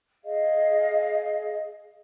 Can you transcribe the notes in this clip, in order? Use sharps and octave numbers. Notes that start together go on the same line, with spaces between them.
G#4 D#5 F5